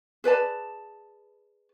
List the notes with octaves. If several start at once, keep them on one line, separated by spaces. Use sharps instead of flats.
G#4 B4 D5 A5